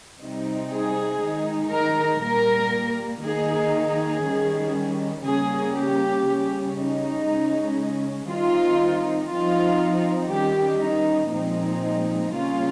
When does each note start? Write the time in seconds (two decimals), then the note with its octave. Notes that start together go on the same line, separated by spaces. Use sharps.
0.19 C3 G3 C4 D#4
0.70 G#4
1.20 D#3 G#3 D#4
1.71 A#4
2.21 A#2 G3 A#3 A#4
3.23 D#3 A#3 D#4 G#4
3.74 G#4
4.24 D#3 G3 C#4
5.25 C#3 G3 A#3 C#4 G#4
5.75 G4
6.26 C#3 G3 C#4
6.77 D#4
7.27 C#3 G#3 C#4
8.28 D#3 G3 C4 D#4 F4
9.30 F3 C4 D#4 F4
10.31 D#3 G3 C#4 G4
10.82 D#4
11.32 A#2 F3 G#3 C4 D#4
12.33 C#3 G3 A#3 C#4 F4